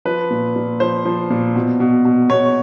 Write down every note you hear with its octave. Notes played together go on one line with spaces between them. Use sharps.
F3 B4
A#2
A#2
F3 C5
F3
A#2
B2
B2
B2
B2 C#5